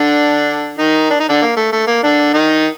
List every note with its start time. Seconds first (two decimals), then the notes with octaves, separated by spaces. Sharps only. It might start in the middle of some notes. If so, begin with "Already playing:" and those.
Already playing: D3 D4
0.79 D#3 D#4
1.10 D4
1.20 D#4
1.29 D3 D4
1.42 A#3
1.57 A3
1.72 A3
1.87 A#3
2.03 D3 D4
2.34 D#3 D#4